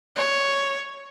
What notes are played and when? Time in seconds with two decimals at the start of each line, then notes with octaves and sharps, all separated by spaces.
0.16 C#5